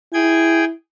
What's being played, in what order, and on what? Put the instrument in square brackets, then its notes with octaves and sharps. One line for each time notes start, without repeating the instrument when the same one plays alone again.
[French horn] E4 [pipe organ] G#4 G5 G#6